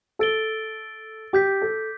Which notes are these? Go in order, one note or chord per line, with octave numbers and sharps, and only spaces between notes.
A4 E6 A6 D7 G7
G4 D6 G6 B6
A4